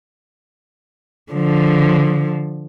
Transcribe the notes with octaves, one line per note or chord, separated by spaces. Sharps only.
D3 F3